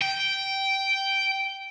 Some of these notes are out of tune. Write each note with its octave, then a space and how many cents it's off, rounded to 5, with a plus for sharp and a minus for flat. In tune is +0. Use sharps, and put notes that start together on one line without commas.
G5 -10